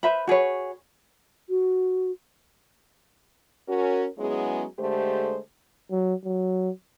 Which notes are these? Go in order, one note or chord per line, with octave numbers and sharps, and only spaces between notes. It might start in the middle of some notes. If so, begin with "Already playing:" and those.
B4 C5 E5 B5
F#4 G#4 B4 C#5
F#4
C#4 F#4 A#4
F#3 G#3 B3 C#4 E4 G#4
D3 G#3 A3 G4 C5
F#3
F#3